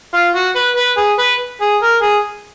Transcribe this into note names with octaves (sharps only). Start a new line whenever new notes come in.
F4
F#4
B4
B4
G#4
B4
G#4
A#4
G#4